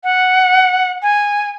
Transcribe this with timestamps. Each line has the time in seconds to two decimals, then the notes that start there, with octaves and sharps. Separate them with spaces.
0.04 F#5
1.02 G#5